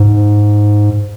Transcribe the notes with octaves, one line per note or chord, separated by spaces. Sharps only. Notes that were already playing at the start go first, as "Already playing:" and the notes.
Already playing: G#2